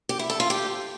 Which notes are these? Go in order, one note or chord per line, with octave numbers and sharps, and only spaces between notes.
G4
E4
A4
F4
G4